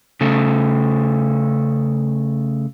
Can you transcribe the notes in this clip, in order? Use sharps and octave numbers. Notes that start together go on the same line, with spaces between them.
C#3 A3